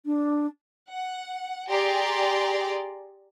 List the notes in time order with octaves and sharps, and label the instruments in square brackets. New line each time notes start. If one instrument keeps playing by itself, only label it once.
[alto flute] D4
[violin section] F#5
G4 G#4 D5 G#5 A#5 C6